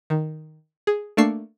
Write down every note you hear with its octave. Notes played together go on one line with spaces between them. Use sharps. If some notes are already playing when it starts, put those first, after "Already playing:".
D#3
G#4
A3 A#3 D4 C#6 E6 C7